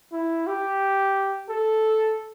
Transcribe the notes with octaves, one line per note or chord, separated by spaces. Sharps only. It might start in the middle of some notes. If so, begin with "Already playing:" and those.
E4
G4
A4